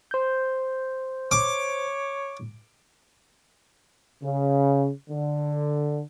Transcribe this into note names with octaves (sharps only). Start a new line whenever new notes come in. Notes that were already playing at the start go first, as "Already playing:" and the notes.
C5 G6
C#5 D6
C#3
D3